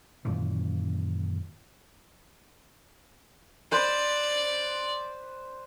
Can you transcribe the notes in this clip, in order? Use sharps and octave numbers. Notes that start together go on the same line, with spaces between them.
F#2 A#2 D#3 E3
B4 C5 D5